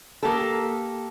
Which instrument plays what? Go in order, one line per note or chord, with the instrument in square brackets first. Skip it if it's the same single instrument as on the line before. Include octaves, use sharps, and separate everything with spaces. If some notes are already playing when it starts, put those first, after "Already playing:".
[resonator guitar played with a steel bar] A#3 G4 A4